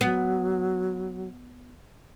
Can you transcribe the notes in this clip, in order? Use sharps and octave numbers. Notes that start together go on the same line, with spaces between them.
F#3 B3